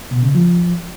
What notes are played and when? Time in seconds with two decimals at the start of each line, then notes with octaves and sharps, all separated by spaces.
0.11 B2
0.23 C#3
0.35 F3